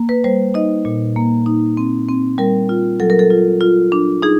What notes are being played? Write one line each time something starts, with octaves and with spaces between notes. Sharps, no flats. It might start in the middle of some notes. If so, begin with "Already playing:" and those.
Already playing: A#3
B4
G3 C5
D#4 D#5
A#2
A#3
D#4
C4
C4
G3 A#4
F4
F#3 A4
A#4
A4
F4
F4
D4
D#4 G#4